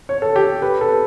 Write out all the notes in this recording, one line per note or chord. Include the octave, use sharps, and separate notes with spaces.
C#5
A4
G4
B4
A4
B4